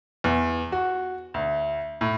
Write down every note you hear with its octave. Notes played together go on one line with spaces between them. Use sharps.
E2
F#4
D2
A2